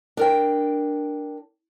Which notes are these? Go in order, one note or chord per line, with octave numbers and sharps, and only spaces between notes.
D4 A#4 G5